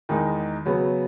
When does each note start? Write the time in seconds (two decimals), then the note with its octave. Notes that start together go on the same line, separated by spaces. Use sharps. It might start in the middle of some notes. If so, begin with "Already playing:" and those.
0.09 E2 D#3 G#3 D#4
0.66 C#3 F#3 B3